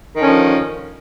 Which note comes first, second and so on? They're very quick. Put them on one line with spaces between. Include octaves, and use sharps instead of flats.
D#3 D3 C#4 F3